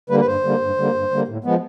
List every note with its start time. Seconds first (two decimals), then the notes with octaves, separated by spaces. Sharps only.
0.10 D3 G3 A#3 B4
0.20 B4
0.27 G2 C5
0.44 D3 G3 A#3
0.61 G2
0.78 D3 G3 A#3
0.94 G2
1.11 D3 G3 A#3
1.28 A2
1.44 F3 G#3 B3